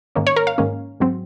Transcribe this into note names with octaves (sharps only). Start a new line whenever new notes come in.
G#2 D#3 A#3 C#4
C#5
A#4
F5
G#2 D#3 A#3 C#4
G#2 F#3 C4